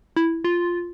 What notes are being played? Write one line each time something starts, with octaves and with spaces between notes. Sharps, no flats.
E4
F4